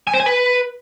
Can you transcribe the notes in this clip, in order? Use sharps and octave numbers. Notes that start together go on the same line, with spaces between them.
G#5
C5
G#5
B4